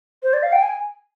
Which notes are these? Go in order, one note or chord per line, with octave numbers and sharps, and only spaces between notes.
C5
D5
F5
G5
G#5